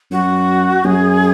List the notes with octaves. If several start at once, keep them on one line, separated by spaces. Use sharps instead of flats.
F#2 F#4
F#2 G#4